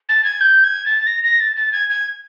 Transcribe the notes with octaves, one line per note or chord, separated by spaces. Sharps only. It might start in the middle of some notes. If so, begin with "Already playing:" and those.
A6
G#6
G6
G#6
A6
A#6
A#6
A6
A6
G#6
G#6